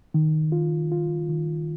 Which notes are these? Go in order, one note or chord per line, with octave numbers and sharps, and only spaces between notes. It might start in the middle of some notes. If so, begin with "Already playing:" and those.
D#3
F4
F4
D#3